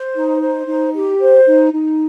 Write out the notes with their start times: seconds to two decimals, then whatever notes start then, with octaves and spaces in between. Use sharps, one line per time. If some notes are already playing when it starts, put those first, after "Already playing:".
Already playing: C5
0.14 D#4
0.41 C5
0.66 D#4
0.94 G4
1.19 C5
1.46 D#4
1.72 D#4